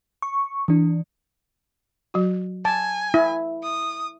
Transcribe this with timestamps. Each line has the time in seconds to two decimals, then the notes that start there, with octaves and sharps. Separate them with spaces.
0.22 C#6
0.68 E3 D4
2.14 F#3 F#4
2.65 G#5 A5
3.14 E4
3.63 D#6